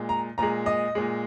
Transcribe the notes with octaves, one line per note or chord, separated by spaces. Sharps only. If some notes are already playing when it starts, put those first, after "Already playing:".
Already playing: A#2 G#3
A#5
A#2 G#3 A#5
D#5
A#2 G#3